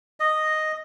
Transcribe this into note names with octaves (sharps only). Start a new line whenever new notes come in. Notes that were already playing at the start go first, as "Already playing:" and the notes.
D#5